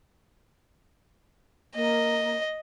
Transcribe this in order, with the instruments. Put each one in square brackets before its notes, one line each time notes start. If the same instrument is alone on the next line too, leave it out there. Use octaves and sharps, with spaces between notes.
[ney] A#3 [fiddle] D#5